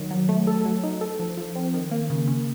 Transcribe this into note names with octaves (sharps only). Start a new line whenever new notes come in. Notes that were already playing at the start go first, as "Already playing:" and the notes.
Already playing: D#3 F#3
F#3
A3
A4
F#3
D#4
A4
F3
F3
C4
D#3
A#3
C#3
C#3